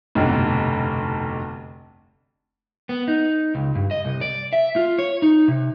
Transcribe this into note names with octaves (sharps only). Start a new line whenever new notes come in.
F1 B1 G2 D3
B3
D#4
C#2
G2
D#5
C2
D5
E5
F4
C#5
D#4
C3